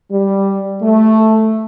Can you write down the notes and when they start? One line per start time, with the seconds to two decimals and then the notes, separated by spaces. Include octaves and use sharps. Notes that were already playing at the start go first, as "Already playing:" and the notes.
0.12 G3
0.82 A3